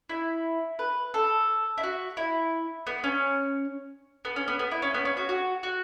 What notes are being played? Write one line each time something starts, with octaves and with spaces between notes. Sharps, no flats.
E4
B4
A4
E4
F#4
E4
B3
C#4
B3
C#4
B3
B3
E4
C#4
B3
C#4
F#4
F#4
F#4